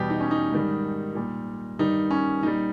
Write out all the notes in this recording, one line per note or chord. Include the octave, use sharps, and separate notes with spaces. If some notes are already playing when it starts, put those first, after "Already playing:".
Already playing: E2 B2 G3 G4
D#4
C#4
D#4
G#2 D#3 G3
A#2 G3
G2 D#3 G3 D#4
C#4
A#2 G3 D#4